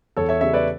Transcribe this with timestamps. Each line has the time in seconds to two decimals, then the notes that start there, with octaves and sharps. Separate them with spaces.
0.17 E2 A4 C#5
0.29 C#5 E5
0.41 C#3 G3 C#5 E5
0.53 B4 D5